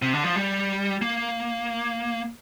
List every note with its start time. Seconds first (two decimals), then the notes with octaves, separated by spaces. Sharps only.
0.02 C3
0.13 D3
0.24 F3
0.36 G3
1.01 A#3